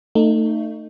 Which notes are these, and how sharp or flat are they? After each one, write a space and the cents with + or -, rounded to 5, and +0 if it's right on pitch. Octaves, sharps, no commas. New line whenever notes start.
A3 +25 D#4 -15